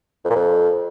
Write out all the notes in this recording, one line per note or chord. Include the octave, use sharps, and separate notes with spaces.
F2
A#2
F2